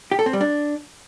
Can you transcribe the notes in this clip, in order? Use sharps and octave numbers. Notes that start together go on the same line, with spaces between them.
G4
A4
C4
G3
D4